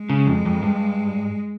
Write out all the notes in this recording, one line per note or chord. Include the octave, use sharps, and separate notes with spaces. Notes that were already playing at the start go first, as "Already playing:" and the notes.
Already playing: G#3
C#3
F2
F2
G2